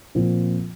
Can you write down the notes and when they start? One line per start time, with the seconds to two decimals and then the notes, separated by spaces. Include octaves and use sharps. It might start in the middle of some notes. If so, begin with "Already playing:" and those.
0.15 A#2 F3 C4 F4